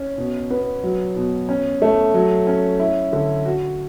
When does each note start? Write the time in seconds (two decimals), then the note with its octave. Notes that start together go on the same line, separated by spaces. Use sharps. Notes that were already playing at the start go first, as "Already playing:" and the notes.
Already playing: C#4
0.18 B2
0.50 B3
0.83 F#3
1.16 B2
1.49 C#4
1.82 A3
2.14 F#3
2.47 C#4
2.80 E4
3.13 D3
3.45 F#4